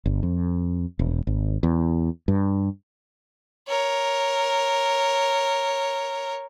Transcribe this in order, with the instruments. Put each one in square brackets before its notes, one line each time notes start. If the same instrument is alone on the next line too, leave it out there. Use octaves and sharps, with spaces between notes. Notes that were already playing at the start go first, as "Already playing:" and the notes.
[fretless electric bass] G1
F2
E1
G#1
E2
G2
[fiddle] A#4 C#5